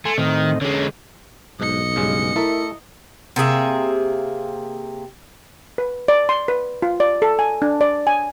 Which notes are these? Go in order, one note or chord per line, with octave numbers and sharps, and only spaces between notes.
A3 G#5 C6
A2 D#3 C4 D#5
D3 G#3 C#4
B1 G#2 D#5 C#7
G2 C#3 G#3
A3 E4 A4 A#4 E5
C3 A#3 G#4 E5
B4
D5
C6
B4
F4
D5
A4
G#5
D4
D5
G#5